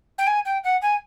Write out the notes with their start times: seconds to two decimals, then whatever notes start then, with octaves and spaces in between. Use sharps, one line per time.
0.18 G5
0.27 G#5
0.45 G5
0.64 F#5
0.82 G#5